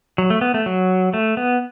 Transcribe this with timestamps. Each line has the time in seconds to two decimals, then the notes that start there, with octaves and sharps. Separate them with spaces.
0.18 F#3
0.30 A3
0.41 B3
0.54 A3
0.66 F#3
1.14 A3
1.37 B3